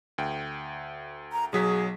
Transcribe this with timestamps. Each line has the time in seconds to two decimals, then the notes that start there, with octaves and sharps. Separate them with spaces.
0.18 D2 G5
1.32 A#5
1.53 B1 F#3 G#4 B6